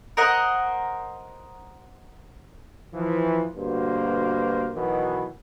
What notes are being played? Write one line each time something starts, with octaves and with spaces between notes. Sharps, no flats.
A#4 C5 D#5 F#5
E3 F3
D2 G2 B2 A#3 C5
B2 D#3 E3 F#3